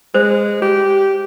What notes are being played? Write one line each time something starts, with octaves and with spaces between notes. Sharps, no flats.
G#3 C5
G4